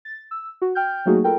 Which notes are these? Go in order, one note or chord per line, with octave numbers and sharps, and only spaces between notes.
A6
E6
F#4
G5 F6 G6
F#3 A3 A#3 D#4 F#4 G#4
F4 A4 A#4 G5